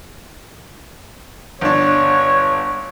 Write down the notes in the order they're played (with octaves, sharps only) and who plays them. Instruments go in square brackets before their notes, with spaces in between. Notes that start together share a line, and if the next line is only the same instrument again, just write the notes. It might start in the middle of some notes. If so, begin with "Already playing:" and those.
[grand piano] G1 D4 [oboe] C#5